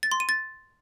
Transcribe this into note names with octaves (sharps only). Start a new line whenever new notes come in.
A6
C6
D#7
A6